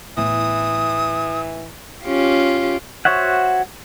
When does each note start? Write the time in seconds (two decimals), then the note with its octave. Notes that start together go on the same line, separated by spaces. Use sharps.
0.17 A2 E3 B3 D#6
2.03 C#4 F4 G4
3.05 F#4 C5 C#5 E5 F#5